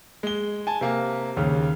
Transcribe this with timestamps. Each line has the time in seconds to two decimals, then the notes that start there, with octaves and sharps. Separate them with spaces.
0.23 G#3 G7
0.67 G#5 A5
0.81 C3 A#3
1.37 D#2 C#3